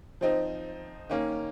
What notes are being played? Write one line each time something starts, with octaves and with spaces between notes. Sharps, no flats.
F3 C4 D#4
D#3 A#3 C#4